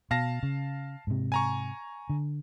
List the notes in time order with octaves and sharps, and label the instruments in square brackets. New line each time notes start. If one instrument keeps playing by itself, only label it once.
[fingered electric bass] B2 [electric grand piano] F5 A5 A#6
[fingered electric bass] C#3
G#2 C3
[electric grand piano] G#5 A#5 C#6
[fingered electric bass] D3